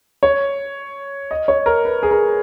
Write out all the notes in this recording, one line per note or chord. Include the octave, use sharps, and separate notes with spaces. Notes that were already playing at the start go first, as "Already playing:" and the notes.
C#5
D#5
C#5
A#4
B4
G#4
A#4